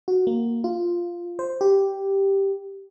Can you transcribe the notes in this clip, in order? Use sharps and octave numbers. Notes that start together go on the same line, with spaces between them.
F#4
A#3
F4
C5
G4